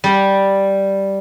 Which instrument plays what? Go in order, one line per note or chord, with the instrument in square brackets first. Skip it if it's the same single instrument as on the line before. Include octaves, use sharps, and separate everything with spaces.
[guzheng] G3